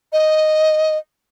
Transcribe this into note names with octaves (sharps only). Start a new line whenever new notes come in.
D#5